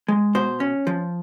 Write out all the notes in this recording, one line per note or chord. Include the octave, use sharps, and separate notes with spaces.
G#3
B2 C5
C#4
F3